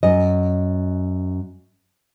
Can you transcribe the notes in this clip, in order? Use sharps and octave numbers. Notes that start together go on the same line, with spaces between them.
F#2 D#5